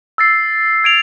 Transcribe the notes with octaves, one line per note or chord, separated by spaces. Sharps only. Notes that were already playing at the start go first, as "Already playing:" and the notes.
E6 A6 C7
G#6 D7 F7